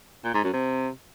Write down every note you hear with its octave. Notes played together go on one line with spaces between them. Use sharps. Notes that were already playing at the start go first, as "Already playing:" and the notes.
A#2
G#2
F#2
C3